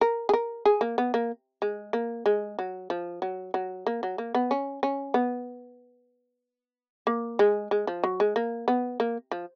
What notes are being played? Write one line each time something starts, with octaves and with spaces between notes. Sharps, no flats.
A#4
G#4
A#4
G#4
A#3
B3
A#3
G#3
A#3
G#3
F#3
F3
F#3
F#3
A#3
F#3
A#3
B3
C#4
C#4
B3
A#3
G#3
G#3
F3
F#3
G#3
A#3
B3
A#3
F3